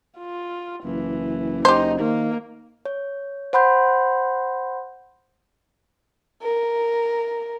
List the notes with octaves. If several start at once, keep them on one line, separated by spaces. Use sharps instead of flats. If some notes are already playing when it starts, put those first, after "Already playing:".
F4
F#1 E3
D#4 G4 C5
D#3 A#3
C#5
C5 F#5 B5 C6 G6
A#4